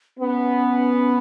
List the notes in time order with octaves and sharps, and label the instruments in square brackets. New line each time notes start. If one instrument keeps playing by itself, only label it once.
[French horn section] B3 [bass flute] C#4